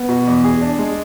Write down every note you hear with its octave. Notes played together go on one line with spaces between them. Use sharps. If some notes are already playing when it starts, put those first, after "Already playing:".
Already playing: B3
B2
E2
G#4
D4
G#3